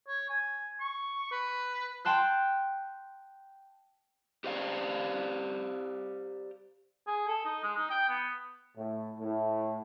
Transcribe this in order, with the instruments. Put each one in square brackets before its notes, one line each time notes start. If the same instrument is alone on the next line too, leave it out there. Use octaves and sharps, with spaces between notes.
[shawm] C#5
G#5
C#6
B4
[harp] G5 A5 C6 F#6
[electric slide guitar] G4 C5 D5 F5
[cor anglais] G#4
A4
D#4
G#3
D#4
G5
B3
[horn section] A2
A2